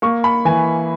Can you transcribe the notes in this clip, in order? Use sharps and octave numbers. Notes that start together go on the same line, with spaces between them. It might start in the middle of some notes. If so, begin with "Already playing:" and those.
A#3 C#6
B5
E3 G#5